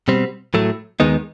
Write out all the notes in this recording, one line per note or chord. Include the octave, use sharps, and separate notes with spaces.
B2 G3 C4
A2 F#3 A3
D#2 D#3 G#3 B3 D#4